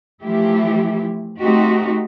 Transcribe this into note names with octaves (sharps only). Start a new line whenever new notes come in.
E3 F3 A3 E4 G4
A3 C4 D#4 F#4 G4